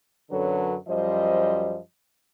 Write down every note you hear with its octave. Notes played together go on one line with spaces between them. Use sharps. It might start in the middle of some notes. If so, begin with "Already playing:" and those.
F#2 D3 F#3 C#4 A4 B4
F#2 F3 G3 C5 D#5